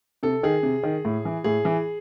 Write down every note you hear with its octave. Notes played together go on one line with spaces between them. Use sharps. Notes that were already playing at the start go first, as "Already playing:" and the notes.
C3 A4
D#3 G#4
C3
D#3
A2
E3
A2 G#4
E3